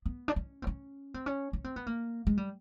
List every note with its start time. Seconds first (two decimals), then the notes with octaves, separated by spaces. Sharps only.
0.06 B3
0.28 D4
0.36 C#4
0.62 C4
0.67 C#4
1.14 C4
1.26 C#4
1.53 C#4
1.64 C4
1.76 B3
1.87 A#3
2.27 G#3
2.37 G3